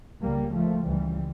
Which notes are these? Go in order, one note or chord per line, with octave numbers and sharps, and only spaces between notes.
C#2 C#3 G3 A#3
F3 A3
C#2 C#3 E3 G3